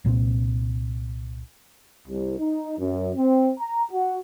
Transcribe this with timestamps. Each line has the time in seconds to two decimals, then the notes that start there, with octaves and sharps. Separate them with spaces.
0.05 C2 A#2 F3 C4
2.08 C2
2.39 D#4
2.78 F#2
3.16 C4
3.59 A#5
3.92 F#4